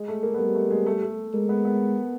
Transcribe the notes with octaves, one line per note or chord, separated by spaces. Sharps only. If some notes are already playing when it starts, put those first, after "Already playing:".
Already playing: G#3
A3
A#3
B3
G3 A#3
A3
G#3
A3
A3
G#3 A#3
B3
B3